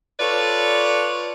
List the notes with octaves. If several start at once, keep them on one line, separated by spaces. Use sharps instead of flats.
F4 A4 B4 C#5 D5